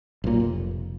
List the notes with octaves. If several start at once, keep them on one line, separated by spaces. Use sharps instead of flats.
B1 A#2
F1